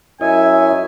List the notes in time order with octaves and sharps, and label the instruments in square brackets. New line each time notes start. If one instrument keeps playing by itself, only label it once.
[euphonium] F#2 [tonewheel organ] E4 C#5 D#5 [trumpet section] E5 [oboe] G#5